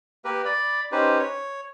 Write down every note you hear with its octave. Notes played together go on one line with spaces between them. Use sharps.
A#3 G4 A#4 B4
D5 B5
C#4 D#4 G4 B4 C5
C#5